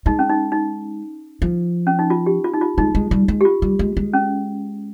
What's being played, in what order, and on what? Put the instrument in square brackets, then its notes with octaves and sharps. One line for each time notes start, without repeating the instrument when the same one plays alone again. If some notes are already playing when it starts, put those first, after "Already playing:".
[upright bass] G#3 [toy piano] D#4
[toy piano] C#4
D#4
D#4
[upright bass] F3
[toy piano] C#4
D#4
F4
G4
F4
D#4
F4
[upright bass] G#3 [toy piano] D#4
[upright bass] G#3
G3
G#3
[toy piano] G4
F4
[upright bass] G3
G#3
G#3
[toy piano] C#4